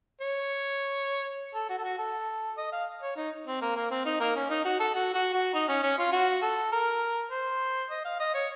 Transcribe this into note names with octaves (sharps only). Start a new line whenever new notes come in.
C#5
A4
F#4
A4
F#4
A4
D#5
F5
C#5
D#4
C4
A#3
A#3
C4
D#4
A#3
C#4
D#4
F#4
A4
F#4
F#4
F#4
D#4
C#4
C#4
F4
F#4
A4
A#4
C5
D#5
F5
D#5
C#5